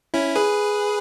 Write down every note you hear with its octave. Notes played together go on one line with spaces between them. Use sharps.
C#4 E4
G#4 B4